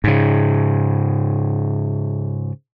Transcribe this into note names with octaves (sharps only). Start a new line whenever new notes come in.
G#2 C#3